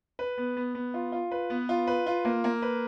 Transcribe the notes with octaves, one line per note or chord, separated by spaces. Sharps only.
B4
B3
B3
B3
F4
F4
B4
B3
F4
B4
F4
A#3
A#3
B4